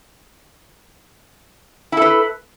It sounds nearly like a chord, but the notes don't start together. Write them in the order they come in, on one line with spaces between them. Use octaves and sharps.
E4 A4 B4